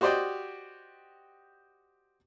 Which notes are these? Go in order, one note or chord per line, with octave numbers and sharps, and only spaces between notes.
F#4 G4 C5 D5 D#5 G5